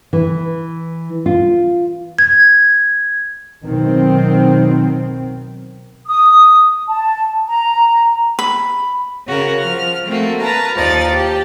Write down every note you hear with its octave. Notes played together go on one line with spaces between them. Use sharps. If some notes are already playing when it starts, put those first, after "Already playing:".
E3
F4
G#6
B2 D#3 F#3 C4
D#6
A5
A#5
B5
C#3 F#4 A#4
F3 F6
A3 A#3 C4 F#4
A#4 B4 A5 A#5
D#2 F3 D#4 D5 A6
G4 A5